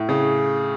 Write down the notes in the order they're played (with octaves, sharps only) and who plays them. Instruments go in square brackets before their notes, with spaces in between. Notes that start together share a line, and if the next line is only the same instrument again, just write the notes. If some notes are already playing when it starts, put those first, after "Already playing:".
Already playing: [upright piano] A2
C#3